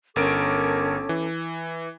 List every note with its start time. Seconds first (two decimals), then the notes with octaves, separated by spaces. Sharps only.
0.16 G1 C#4 A4 A#4 D6 D7
1.09 E3